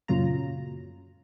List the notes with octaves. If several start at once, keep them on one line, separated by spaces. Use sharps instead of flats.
F#2 A#2 C#3 F#3 F4 A#5